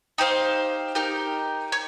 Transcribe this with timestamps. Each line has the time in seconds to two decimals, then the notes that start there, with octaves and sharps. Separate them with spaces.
0.18 D#4 G4 C5 F5
0.95 D#4 G4 A#4
1.72 C#5